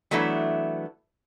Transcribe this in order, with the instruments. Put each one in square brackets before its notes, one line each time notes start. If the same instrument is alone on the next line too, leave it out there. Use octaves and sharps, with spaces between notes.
[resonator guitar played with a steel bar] E3 F#3 A3 B3 D4 E4